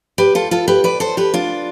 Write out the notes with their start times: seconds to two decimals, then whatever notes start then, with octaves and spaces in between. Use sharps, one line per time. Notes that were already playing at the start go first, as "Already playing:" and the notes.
0.18 G4 B4
0.35 F4 A4
0.51 F4 A4
0.68 G4 B4
0.84 B4 D5
1.00 A4 C5
1.17 G4 B4
1.34 D4 F4